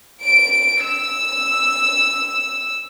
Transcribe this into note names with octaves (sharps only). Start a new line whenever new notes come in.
D7
E6